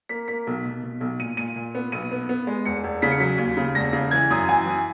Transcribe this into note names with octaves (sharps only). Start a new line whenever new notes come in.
A#3 B6
A#3 B6
B1
B2
B2
B1
A#2 D#7
A#2 D#7
A#2
B3
B1 D#7
B3
B3
G#3
E1 C#7
E1
C#3 B6
C#7
F#3 B6
D#2
C#3
E1 A#6
C#3
E3 G#6
F#2 D#6
E3 G#5
E3